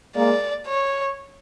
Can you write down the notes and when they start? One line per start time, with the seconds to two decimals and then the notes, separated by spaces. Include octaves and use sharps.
0.15 G#3 A#3 D5
0.67 C#5